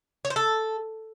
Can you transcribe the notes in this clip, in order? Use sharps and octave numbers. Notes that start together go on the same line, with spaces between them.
C#5
C5
A4